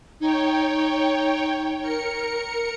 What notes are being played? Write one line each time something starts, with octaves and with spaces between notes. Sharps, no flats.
D#4 C#5 G5
A#4 C#7